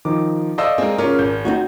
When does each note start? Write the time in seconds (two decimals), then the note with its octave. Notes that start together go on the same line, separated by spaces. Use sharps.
0.05 D#3 F3 D#4 D6
0.58 A4 C5 D5 D#5 F5 E6
0.78 G#3 C4 G#4 A#4
0.98 C#3 C#4 F4 A#4 D6
1.19 G#1 G6
1.45 C4 D#4 F#4